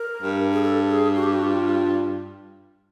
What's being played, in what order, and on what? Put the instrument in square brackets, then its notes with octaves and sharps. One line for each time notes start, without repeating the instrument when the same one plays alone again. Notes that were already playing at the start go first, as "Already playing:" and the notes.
Already playing: [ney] A#4
[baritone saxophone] G2
[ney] G#4
A4
G#4
F#4
G4
F#4
F4